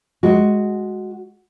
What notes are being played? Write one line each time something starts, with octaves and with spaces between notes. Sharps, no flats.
G#3 F#4